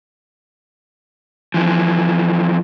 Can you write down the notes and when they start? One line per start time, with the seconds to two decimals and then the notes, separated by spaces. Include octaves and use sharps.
1.54 F2 E3 F3